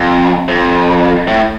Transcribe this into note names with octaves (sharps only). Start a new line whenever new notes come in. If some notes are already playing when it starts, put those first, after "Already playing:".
Already playing: F2
F2
A2